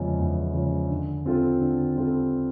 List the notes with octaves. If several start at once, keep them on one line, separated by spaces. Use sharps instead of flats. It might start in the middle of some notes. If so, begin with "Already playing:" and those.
Already playing: E2 C#3 F3 G#3
E2
C#3 F3 G#3
D3
G3 C4 F4 A4
D3
G3 C4 F4 A4